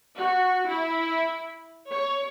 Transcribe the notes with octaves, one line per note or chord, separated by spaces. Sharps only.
F#4
E4
C#5